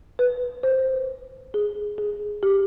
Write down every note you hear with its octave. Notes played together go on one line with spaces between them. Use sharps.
B4
C5
G#4
G#4
G4